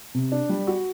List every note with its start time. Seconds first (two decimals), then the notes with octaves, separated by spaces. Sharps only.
0.14 C3
0.32 D4
0.49 G3
0.67 F#4